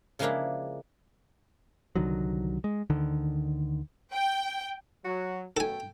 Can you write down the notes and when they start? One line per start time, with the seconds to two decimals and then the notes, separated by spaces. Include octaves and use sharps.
0.19 C#3 F3 G#3 A#3 D4 E4
1.96 C2 D3 D#3 F#3
2.64 G#3
2.90 D2 D3 D#3
4.13 G5
5.04 F#3 F#4
5.57 F#2 B2 A3 A4 G5 G#5